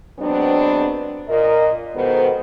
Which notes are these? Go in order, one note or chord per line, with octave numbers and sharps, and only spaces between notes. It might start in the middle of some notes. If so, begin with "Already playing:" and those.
F#3 G#3 B3 C4 D4
A#2 A#4 D#5
G#2 B2 D#3 B3 A4 C5